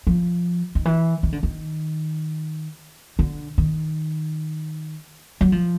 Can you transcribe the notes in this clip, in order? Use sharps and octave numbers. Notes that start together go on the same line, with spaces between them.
F3
D#3
E3
D#3
D3
D#3
D3
D#3
F#3
F3